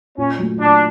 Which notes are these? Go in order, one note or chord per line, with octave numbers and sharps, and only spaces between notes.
A#2 C#4
F#3 A3
A#2 D4